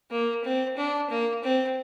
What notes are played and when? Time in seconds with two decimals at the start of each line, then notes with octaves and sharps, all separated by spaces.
0.11 A#3
0.44 C4
0.77 D4
1.10 A#3
1.43 C4